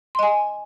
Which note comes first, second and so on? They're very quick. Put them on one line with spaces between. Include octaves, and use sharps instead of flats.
C6 D#5 G#5